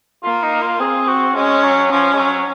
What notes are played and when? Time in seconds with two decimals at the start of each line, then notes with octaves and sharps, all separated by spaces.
0.24 A#3 F4
0.43 D#4
0.62 F4
0.80 C4 G#4
1.08 F#4
1.35 G#3 C#4
1.64 F#3
1.91 F3 C#4
2.13 G#3
2.19 F#3